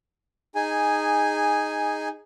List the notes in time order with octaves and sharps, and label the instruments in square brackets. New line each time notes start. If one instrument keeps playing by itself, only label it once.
[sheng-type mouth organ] D#4 G#4 G#5